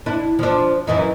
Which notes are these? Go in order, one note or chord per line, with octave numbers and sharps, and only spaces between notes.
D4 E4
F3 D4
F#2 E3 D#4